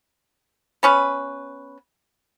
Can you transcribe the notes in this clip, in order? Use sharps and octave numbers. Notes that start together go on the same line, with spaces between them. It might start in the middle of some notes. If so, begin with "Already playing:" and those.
B3 C#4 B4